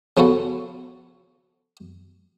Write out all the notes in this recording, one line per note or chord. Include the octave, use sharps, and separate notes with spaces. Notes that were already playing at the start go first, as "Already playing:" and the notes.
C#3 F3 B3 F#4 A4